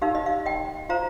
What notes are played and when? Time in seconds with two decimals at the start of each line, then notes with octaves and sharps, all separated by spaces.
0.02 D#4 G4 A#4 F5
0.15 D#5
0.26 F5
0.46 D#5 G5
0.89 F4 C5 F5 A#5